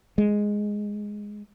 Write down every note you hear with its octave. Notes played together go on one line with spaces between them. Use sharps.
G#3